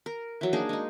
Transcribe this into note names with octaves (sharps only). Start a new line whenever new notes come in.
A#4
E3 F#3
A#3 D4 D#4 G#4
G#3 D#4